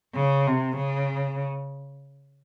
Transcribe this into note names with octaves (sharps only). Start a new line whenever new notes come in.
C#3
C3
C#3